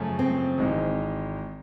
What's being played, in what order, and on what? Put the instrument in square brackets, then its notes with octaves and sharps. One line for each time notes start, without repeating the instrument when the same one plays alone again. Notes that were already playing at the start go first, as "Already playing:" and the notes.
Already playing: [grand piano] F#2 C#3 F3 A3 C#4
[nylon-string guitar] C4
[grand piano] G#1 G#2 E3 G#3